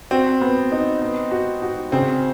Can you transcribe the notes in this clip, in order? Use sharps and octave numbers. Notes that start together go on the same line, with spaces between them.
C4 F#4
B3
D#4
B3
F#4
F#4
C#3 C4